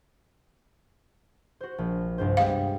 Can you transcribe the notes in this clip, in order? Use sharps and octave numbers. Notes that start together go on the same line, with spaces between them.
F#4 C5
A#1
C2 G2 C5
G3 G#3 B3 F5